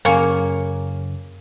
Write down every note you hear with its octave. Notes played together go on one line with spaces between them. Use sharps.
F#2 C#3 A#3 C#5 G#5